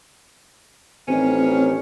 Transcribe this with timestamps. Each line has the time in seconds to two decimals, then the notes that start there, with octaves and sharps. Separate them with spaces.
1.08 A1 D#3 C4 C#4